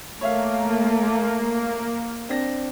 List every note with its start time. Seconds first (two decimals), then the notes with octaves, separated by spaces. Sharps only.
0.21 A3 A#3 C#5 E5 F5
2.29 C4 D4 A#6